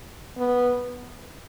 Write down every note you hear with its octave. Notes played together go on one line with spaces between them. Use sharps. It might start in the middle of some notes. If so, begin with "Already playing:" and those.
B3